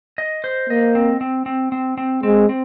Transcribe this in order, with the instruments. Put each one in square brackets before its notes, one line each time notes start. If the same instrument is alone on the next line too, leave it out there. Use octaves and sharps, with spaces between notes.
[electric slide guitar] D#5
C5
[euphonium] A#3 [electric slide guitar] D#5
[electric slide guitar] C4
C4
C4
C4
C4
[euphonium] G#3 [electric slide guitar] C4
[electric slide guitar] C4